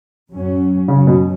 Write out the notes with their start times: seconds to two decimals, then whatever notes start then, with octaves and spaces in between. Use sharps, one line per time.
0.31 F#2 F#3 C#4
0.88 F#2 C#3 F#3 C#4
1.07 B2